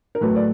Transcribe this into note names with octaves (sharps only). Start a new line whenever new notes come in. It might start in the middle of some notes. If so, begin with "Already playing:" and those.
A#4
A2 F#3 A3 B4
D5